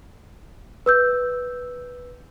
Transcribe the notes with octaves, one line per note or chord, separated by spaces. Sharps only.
B4 E6 G6